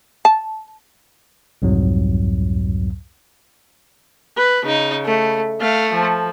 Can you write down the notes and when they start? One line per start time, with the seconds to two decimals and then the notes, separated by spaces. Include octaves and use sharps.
0.25 A5
1.62 C2 F2 G#2 F#3
4.37 B4
4.66 C#3 D#4
5.05 A3
5.61 A3 F5
5.94 F3